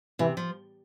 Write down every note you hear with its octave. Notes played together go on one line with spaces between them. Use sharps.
C3 E3
F3